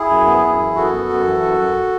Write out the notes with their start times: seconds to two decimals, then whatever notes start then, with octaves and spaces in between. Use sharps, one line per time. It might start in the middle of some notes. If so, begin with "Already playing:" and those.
Already playing: E4 G#4
0.10 F#2
0.26 B3
0.43 F#2
0.60 E3
0.76 F#2 F#4 A4
0.92 B3
1.09 F#2
1.26 E3
1.42 F#2
1.59 F#2